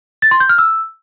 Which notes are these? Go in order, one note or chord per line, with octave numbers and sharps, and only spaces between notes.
A6
C6
G6
F6
E6